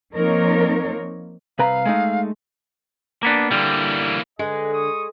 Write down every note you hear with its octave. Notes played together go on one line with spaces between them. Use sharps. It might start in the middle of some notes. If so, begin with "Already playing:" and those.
F3 A#3 C4 D#4 A#4 C#5
C2 B4 F5 A#5
G#3 A3 D#4
A#3 B3 D4
D3 E3 G3 A#3
D3 G#3 G#4 B4 D#5
C#6 D#6